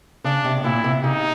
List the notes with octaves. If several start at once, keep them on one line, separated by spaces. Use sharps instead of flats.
C#3 D4
C3
A2
A#2 E4
C3
C#3 D#4